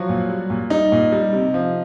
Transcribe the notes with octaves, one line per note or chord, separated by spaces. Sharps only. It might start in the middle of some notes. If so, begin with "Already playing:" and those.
Already playing: F3 F#3 F#4
A#2
G3
A#2
G3 D#4
A#2
G3
C3
F3